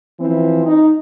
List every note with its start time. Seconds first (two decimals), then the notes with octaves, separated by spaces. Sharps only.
0.20 E3 F3 C4
0.66 D#4